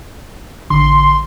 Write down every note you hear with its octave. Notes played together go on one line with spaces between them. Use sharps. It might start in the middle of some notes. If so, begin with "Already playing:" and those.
A1 D3 C6